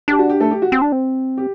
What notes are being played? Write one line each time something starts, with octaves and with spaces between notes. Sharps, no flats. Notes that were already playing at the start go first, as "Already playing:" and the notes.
D4 G4
F#4
G4
A3 A4
G4
F#4
C4
D4
C4
G4